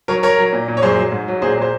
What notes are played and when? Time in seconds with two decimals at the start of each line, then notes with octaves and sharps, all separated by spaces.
0.08 F#3 A#4 C#5
0.23 F#3 A#4 C#5
0.38 F#3
0.53 A#2
0.68 A#2
0.77 C#5
0.82 F#2 G#4 C5
0.97 F#3
1.12 G#2
1.28 F#3
1.42 A#2 G#4 C5
1.58 G#3 C5